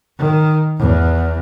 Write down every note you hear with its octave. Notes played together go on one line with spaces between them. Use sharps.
D#3
E2